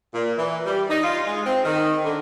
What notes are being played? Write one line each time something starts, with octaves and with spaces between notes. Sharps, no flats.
A#2
E3
G3
D#4
F4
G#3
C4
D#3
D3